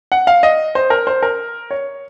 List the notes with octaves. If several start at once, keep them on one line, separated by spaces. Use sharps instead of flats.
F#5
F5
D#5
C5
A#4
C5
A#4
C#5